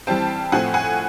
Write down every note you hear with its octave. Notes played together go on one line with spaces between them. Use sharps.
E3 G3 C4 G5 A5
A2 F3 A3 C4 F#5 G#5
F#5 G#5